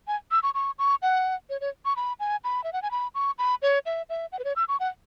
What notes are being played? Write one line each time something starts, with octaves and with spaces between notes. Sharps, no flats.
G#5
E6
C#6
C#6
C#6
F#5
C#5
C#5
C#6
B5
G#5
B5
E5
F#5
G#5
B5
C#6
B5
C#5
E5
E5
F#5
B4
C#5
E6
C#6
F#5